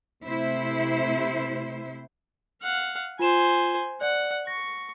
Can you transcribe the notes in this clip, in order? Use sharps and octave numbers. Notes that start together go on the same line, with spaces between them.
C3 A3 E4 C5
F5 F#5
F4 C5 G#5 E7
D5 F#5
C#6 A#6